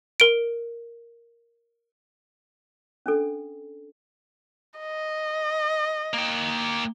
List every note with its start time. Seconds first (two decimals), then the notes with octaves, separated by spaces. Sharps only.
0.20 A#4 D7
3.06 C#4 D4 A4
4.80 D#5
6.13 A#3 G5